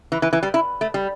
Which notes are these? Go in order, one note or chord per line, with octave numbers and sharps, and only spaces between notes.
E3
E3
E3
G3
E4
A3
G3